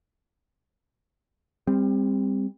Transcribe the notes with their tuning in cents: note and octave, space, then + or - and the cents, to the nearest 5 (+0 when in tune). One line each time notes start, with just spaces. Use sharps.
G3 +30 C4 +0